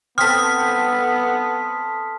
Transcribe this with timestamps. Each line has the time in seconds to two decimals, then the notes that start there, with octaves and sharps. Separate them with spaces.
0.18 B3 C4 A4 D#6 F6 B6